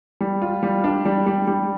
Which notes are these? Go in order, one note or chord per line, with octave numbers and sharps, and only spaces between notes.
G3
F4
G3
D4
G3
G3
G3